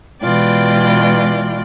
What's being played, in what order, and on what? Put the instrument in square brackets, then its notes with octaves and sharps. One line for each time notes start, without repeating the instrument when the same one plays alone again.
[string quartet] B2 E3 G#3 F4 D5 G5